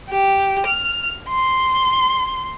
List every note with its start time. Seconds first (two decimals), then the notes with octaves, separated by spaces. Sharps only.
0.10 G4
0.67 F6
1.29 C6